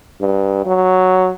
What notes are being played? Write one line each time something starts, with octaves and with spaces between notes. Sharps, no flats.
G2
F#3